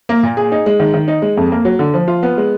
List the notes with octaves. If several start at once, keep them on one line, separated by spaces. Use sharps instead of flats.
A#3
A#2
G#4
D#4
G#3
D#3
D#3
D#4
G#3
F2
A#3
F#3
D3
F3
F4
B3
G#3